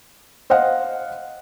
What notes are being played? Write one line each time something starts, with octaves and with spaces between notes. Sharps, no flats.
C5 D#5 F5 F#5